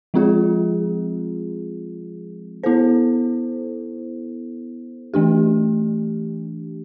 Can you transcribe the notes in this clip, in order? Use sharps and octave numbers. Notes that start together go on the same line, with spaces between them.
F3 G#3 C4 F4 G#4
B3 E4 A4 C5
E3 A3 D4 G4